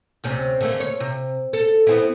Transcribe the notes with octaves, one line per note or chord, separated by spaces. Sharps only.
D2 C3 C#4
D3 A3 A#3
C#5
C3
A4
B3 C4 E4